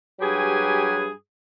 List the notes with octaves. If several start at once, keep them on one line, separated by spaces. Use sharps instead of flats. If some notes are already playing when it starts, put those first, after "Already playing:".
G2 F#3 G4 G#4 B4 G#5